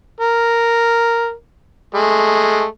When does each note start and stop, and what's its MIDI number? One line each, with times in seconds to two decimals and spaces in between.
0.20 1.32 70
1.94 2.66 56
1.94 2.66 57